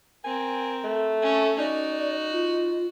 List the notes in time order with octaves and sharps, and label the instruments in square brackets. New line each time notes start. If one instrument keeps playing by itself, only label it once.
[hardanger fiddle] C4 A#4 [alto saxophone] G#5
[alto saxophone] A3
[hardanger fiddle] C#4 A4
[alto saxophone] D#4 [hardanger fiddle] F#4 [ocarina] D5
[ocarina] F4